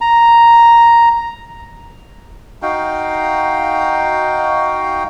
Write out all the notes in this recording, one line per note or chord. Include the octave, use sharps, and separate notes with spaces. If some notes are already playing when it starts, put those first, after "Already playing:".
A#5
D#4 F#4 F5 G5